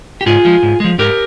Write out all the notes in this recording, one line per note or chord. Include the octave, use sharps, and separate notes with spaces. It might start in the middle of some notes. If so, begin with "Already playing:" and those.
G4
G#2 F4 G#4
F3 G#3
G#2
F3 G#3
G#2 G4 A#4